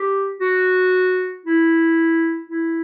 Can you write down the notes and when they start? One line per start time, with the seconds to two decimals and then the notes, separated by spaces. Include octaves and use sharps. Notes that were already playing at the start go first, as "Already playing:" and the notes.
Already playing: G4
0.41 F#4
1.46 E4
2.50 E4